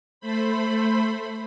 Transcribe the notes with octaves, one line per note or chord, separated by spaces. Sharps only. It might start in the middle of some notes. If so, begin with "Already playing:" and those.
A3 C5 B5